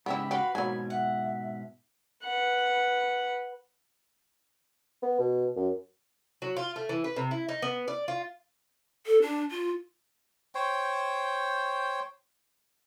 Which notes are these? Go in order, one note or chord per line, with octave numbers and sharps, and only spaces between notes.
G#2 C#3 B3 E4 G4 E5 B5
F#4 G4 B4 F5
G#2 B2 F#3 A#3 G#5
E5 F#5
B4 F#5
B3
B2
F#2
F#3
F4
A3
E3
B4
C3
E4
D#4
B3
D5
F4
A4
D4
F4
C5 C#5 G5